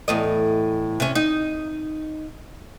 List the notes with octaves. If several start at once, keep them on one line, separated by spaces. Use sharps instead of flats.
E2 A2 D#5
C3 C#4
D#4